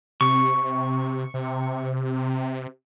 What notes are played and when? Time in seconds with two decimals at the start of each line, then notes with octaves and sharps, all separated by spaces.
0.21 C3 C#6
1.34 C3